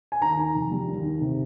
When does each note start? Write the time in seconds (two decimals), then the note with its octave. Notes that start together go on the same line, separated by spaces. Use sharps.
0.12 G#5
0.21 D#2 A#5
0.38 D#3
0.55 F1
0.71 G3
0.87 D#2
1.04 D#3
1.21 C3